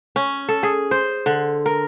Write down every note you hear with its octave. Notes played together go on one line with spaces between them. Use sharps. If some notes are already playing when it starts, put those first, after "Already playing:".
C#4
A4
G#4
C5
D3
A#4